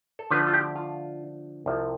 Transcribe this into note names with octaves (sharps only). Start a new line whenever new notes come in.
A4
D3 F3 A3 D4 B4
F4
G4
F4
C2 C3 F3